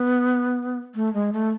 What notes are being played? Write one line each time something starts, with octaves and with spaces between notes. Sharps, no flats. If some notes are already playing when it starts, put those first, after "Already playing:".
Already playing: B3
A3
G#3
A3